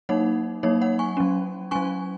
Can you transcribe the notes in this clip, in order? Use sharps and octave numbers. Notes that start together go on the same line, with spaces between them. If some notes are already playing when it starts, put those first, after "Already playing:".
F#3 A#3 D#4 C#5 F#5
F#3 A#3 D#4 C#5
C#5 F#5
G#5 C#6
F#3 C#4
F#3 C#4 G#5 C#6